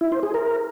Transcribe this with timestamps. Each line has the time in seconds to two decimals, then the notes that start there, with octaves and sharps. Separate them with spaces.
0.01 E4
0.12 C5
0.23 G#4
0.34 A#4